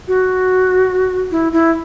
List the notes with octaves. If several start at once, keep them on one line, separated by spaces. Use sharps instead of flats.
F#4
E4
E4